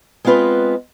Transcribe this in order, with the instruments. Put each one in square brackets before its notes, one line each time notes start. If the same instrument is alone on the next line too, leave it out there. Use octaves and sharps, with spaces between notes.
[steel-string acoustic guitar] G#3 B3 C4 F4 B4